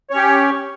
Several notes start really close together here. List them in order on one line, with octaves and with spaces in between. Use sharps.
C#5 C#4 G4